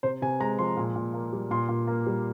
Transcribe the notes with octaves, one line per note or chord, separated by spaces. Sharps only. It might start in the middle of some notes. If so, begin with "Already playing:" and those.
C3 C5
C3 G#5
G#3 A#5
F3 C6
A#2
A#2
A#3
G3
A#2 C6
A#2
A#3
G3